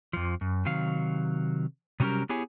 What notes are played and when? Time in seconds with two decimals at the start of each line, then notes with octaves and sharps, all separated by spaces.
0.13 F2 F3
0.41 F#2
0.65 C3 D#3 F#3 F5
2.00 C3 F#3 G3 C#4 G4 A#4
2.29 B3 E4 G4 G#4 C#5 G#5